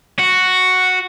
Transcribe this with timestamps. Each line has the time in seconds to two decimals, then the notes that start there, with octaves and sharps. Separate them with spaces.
0.19 F#4